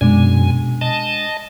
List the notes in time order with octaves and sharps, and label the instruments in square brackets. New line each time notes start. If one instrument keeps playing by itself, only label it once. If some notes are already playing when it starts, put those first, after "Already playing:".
[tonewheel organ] F#2 G#5 [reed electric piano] B2 [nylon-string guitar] G#3 D4 D5
[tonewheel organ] D#5 A5